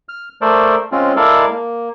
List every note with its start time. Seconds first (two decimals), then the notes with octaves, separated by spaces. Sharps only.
0.09 F6
0.41 A3 A4 A#4 C5 D5
0.92 G#3 C4 C#4 F4
1.16 G#3 E4 A4 A#4 D5 F5
1.51 A#3